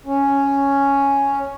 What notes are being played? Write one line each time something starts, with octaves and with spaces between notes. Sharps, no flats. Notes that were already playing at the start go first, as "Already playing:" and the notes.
C#4